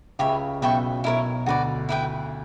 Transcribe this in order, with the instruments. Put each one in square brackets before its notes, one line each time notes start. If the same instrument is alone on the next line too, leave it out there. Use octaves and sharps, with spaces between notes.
[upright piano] C#2 C#3 [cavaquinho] G4 C#5 E5 B5
[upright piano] B1 B2 [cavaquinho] B4 E5 G5 C#6
[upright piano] B1 B2 [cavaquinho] E4 A#4 C#5
[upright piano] D2 D3 [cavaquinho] F#4 B4 D5
[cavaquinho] E4 B4 E5 G5